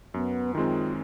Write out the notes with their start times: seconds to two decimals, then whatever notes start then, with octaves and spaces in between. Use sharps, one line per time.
0.14 F#2 B3
0.55 D#3 G#3 C4 F4